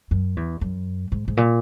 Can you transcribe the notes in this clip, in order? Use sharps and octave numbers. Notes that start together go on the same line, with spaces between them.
F#2
E2
F#2
G#2
G#2
A#2